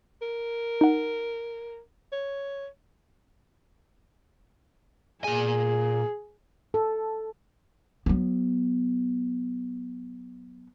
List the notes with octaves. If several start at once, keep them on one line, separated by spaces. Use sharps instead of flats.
A#4
D#4 F#5
C#5
A#2 G#4 G#5
A4
F#3 B3